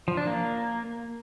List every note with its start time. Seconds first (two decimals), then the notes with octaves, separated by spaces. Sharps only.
0.08 F3
0.17 D4
0.27 A#3